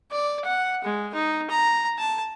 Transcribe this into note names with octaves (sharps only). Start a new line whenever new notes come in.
D5
F#5
G#3
D#4
A#5
A5